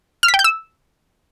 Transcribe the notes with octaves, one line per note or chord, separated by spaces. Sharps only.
F6
B6
G5
G6
E6